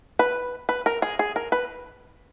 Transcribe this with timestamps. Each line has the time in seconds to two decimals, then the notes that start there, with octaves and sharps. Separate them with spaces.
0.19 B4
0.69 B4
0.86 A#4
1.02 G#4
1.19 G#4
1.36 A#4
1.52 B4